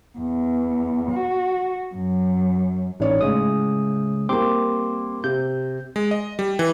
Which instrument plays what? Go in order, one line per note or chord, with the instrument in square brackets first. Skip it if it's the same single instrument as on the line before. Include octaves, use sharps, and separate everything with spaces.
[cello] E2
F#4
F#2
[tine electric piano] A1 [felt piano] D#4 C#5 D5
[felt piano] A2 [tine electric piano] C#3 G#3 D#6
[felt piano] G3 A#3 [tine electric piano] C4 C6 D6
[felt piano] C3 [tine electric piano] G6
[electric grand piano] G#3
D#5
G3
E3